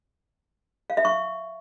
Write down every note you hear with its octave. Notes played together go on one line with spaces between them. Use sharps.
F5
E5
C#6